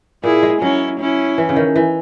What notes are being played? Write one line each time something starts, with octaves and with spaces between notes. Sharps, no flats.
A#2 E4 G#4
G#3
F#3 C#4 E4
C#4 E4
E3
C#3
D#3
E3